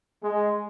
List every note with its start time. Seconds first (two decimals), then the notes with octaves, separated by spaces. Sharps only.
0.22 G#3